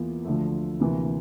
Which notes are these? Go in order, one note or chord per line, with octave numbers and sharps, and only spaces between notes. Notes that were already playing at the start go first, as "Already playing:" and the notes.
Already playing: E2 E3 A#3 F4
D2 D3 F3 A3
D2 C3 E3 A#3